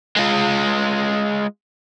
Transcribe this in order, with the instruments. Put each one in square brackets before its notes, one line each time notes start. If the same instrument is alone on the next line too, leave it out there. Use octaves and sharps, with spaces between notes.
[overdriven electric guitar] G#3 F4